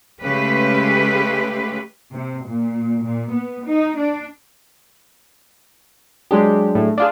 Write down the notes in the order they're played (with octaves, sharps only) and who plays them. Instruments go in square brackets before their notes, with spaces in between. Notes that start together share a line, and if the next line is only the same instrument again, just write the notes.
[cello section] C#3 G#3 A3 G4 B4
C3
A#2
A#2
B3
D#4
D4
[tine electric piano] F#3 D4 G#4 [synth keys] G#3 G4
[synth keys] A2
D4 F4 G#4